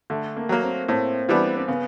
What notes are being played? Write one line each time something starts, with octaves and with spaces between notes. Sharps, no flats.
D3 A3
A#3
F#3 A#3
C4
A2 C4
E3 G3 B3 D4
C4
C#3 B3